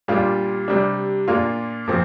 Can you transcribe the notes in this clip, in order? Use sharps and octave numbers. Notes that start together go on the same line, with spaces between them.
A#2 G3 D4 F4
C3 G3 D4
A#2 A#3 D4 F4
A#2 F3 C4